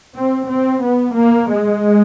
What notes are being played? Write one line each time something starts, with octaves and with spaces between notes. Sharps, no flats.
C4
C4
B3
A#3
G#3